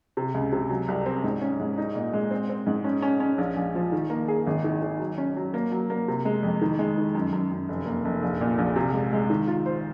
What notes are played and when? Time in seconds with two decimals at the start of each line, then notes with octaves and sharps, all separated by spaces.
0.17 C3
0.34 C#2
0.52 C3
0.69 F#3
0.88 C2
1.06 C4
1.24 G#2
1.41 C#4
1.59 G#2
1.78 D#4
1.96 A#2
2.13 G#3
2.31 C4
2.49 C4
2.67 G#2
2.84 C#4
3.02 C#4
3.20 C#4
3.38 A#1
3.56 A#1
3.75 F3
3.92 D#3
4.10 A#3
4.28 G#4
4.47 G#1
4.64 D#3
4.82 D#3
4.99 F#3
5.18 C#4
5.36 F#3
5.54 A#3
5.72 F#3
5.90 A#3
6.08 C3
6.25 G#3
6.43 F2
6.61 D#3
6.79 G#3
6.98 D#3
7.15 F#2
7.32 F#2
7.51 F#2
7.68 F1
7.86 A#3
8.05 F1
8.22 A#1
8.41 A#2
8.58 A#1
8.76 C3
8.93 G#3
9.13 G#3
9.30 D#3
9.48 F4
9.66 C5